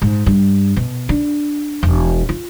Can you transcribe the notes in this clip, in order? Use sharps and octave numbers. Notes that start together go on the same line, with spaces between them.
G#2
G2
B2
D4
E1
F4